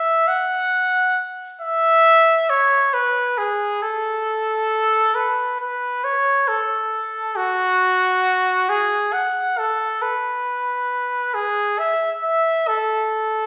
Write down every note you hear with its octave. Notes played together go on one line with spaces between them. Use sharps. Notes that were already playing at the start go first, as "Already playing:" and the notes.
Already playing: E5
F#5
E5
C#5
B4
G#4
A4
B4
B4
C#5
A4
F#4
G#4
F#5
A4
B4
G#4
E5
E5
A4